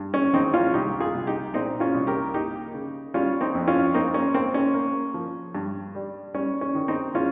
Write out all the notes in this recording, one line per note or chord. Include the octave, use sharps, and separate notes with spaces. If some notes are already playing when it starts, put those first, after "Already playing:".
Already playing: G2
C#4
G#1 C4 D#4
C#4 F4
C2 D#4 G4
F4 G#4
C2
D#4 G4
A#2 C4 D#4
C#4 F4
C2
G4 A#4
A#3 D#4 G4
C#3
G3 C#4 F4
C4 D#4
F2
C#4 F4
A#3 C4 D#4
C#4
A#3 C4
C#4
A#3
F3
G2
G3
G3 C#4
C#4
D#3
C4 D#4
G#3 C#4 F4